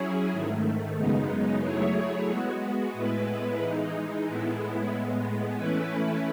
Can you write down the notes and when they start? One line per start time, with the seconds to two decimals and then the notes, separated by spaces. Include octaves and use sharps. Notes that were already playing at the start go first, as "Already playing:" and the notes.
Already playing: F#3 C#4 E4 G#4
0.31 G#2 D#3 A3
0.97 F#2 C#3 G#3 B3 D#4
1.62 F#3 A3 E4 G#4 C#5
2.27 G#3 B3 F#4
2.93 A2 G#3 B3 E4 B4
3.58 E3 G#3 D#4
4.24 A2 G#3 B3 E4
4.89 A2 G#3 B3
5.56 E3 A3 C#4 E4 B4